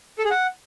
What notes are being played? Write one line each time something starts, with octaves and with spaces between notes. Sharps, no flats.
A4
G#4
F#5